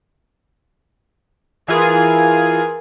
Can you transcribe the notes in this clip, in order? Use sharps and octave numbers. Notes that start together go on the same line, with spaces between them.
E3 F4 G#4 A#4 G#5